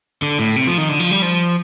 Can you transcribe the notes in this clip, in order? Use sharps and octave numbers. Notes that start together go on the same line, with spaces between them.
D3
A2
C3
F3
D#3
D3
F3
G3
F3